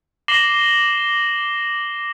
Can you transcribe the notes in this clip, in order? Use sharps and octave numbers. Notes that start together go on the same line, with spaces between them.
D6 A#6 C7 E7 F#7 G7